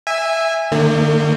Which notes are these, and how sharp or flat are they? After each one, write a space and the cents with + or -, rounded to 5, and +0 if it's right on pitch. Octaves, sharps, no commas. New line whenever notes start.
E5 +0 G#5 -20
D3 +40 A#3 -45